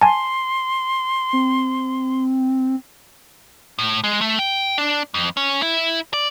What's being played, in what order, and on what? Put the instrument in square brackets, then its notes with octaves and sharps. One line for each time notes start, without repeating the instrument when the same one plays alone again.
[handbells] G#5 A5 [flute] C6
[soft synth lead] C4
[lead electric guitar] A2
G#3
A3
G5
D4
F2
C#4
E4
D5